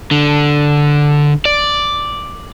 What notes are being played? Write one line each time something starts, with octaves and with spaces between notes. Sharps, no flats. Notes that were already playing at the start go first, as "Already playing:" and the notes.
D3
D5